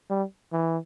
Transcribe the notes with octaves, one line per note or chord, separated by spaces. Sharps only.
G3
E3